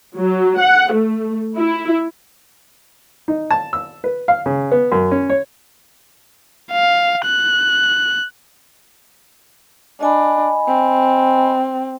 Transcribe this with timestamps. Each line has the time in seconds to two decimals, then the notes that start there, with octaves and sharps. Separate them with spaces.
0.15 F#3
0.58 F#5
0.92 A3
1.57 E4
3.28 D#4
3.51 A5
3.73 E6
4.04 B4
4.28 F5
4.46 C#3
4.72 B3
4.92 F#2
5.11 C#4
5.30 C#5
6.72 F5
7.25 F#6
10.01 D4 D#5 G#5 B5
10.68 C4